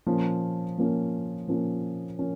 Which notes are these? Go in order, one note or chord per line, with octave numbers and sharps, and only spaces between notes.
A#2 F3 A#3 C#4
A#2 F3 A#3 C#4
A#2 F3 A#3 C#4
F3 A#3 C#4